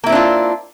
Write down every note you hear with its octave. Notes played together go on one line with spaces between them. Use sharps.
A#3 C4 D4 E4 F4